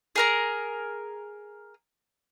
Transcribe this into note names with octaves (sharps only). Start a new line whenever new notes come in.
G#4 A#4 A#5